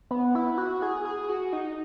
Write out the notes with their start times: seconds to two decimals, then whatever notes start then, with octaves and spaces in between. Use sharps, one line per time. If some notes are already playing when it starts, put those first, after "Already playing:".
0.11 B3
0.35 E4
0.58 F#4
0.82 G#4
1.05 G#4
1.29 F#4
1.53 D#4